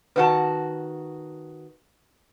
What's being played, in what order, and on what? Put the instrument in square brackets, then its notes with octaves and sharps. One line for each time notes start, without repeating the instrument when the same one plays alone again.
[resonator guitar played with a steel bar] D#3 F#4 A5 [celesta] B4